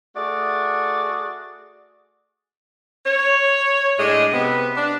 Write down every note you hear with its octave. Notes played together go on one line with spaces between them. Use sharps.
A3 F#4 G#4 D5
C#5
A2 G#3 D4 D#5
C3 B3
D4